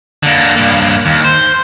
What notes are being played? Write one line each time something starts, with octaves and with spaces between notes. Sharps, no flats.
D3 A#3
G2 A#3
D#2
C5